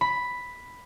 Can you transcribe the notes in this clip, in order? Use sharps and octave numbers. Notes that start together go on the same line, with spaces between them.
B5